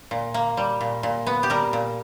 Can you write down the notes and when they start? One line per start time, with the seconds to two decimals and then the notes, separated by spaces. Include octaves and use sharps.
0.11 A#2
0.34 A#3
0.57 G3
0.81 A#2
1.03 A#2
1.27 B3
1.43 G4
1.50 G3 A#4
1.73 A#2